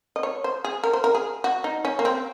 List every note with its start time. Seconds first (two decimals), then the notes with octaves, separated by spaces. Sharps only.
0.16 D#5
0.23 C#5
0.44 C5
0.64 G#4
0.84 A#4
0.93 C5
1.04 A#4
1.15 G#4
1.44 F#4
1.64 D#4
1.85 C#4
1.99 A#3
2.05 C4